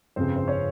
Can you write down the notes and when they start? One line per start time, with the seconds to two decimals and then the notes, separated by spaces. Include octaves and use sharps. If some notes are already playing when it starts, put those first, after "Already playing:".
0.16 G1 F2 C#3 C4 C5
0.37 C5
0.48 C#4 C#5